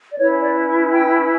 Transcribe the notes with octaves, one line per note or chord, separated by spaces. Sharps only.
D5
C#4 E4 B4 C#5
D5
E5
G5